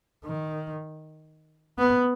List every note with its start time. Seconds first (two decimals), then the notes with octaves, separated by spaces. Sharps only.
0.24 D#3
1.79 B3